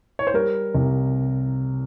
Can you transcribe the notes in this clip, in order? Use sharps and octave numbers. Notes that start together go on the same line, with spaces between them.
C#5
C5
G3 A#4
C2